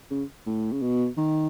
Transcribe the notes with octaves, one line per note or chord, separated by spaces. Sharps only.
C#3
A2
C#3
B2
D#3